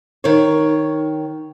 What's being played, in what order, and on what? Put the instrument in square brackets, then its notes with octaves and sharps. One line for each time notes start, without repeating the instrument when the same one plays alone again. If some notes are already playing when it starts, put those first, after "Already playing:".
[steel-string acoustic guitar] D#3 C#5